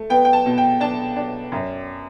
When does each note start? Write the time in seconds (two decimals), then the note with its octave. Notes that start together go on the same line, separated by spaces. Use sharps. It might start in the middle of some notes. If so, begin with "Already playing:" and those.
Already playing: A3
0.10 B3 G5
0.25 G5
0.33 A5
0.46 B2
0.58 G5
0.80 D4 A5
1.16 D4
1.52 F#2